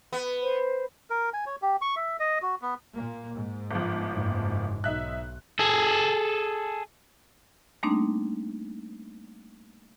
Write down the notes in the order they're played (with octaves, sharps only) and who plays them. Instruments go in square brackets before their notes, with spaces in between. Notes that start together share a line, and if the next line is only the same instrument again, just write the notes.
[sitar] B3
[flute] C5
[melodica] A#4
G#5
C#5
G4
C#6
E5
D#5
F#4
B3
[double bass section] A#2 A#3
G#2
[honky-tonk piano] G1 F3
[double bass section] F#1 G#2
[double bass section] B1 [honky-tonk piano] D#4 E5 F#6
[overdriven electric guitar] G#4 A4
[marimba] G3 A3 A#3 C4 D4 D#4